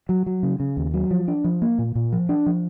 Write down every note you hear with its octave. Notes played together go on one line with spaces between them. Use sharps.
F#3
F#3
C#3
C#3
D#2
F#3
F3
D4
F3
A#3
A#2
A#2
F3
D4
F3